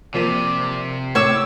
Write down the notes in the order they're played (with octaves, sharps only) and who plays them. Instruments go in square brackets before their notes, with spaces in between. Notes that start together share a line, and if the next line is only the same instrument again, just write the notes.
[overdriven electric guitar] C3 [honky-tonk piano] F3 A#3 D#7 [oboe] D5
[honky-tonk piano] A2 [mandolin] C#5 E6 [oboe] D6